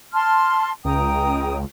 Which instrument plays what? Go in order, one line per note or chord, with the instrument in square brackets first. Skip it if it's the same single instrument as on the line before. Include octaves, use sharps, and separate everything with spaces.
[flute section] A5 C6 F6
[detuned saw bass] C#2 [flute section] G5 A#5 D#6